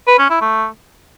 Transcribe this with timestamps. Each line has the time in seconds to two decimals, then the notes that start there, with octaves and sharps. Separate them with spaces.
0.07 B4
0.19 C#4
0.30 E4
0.41 A3